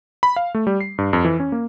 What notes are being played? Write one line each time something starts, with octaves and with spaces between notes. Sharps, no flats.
B5
F5
A3
G3
C7
G2
F2
E3
C#4
A#3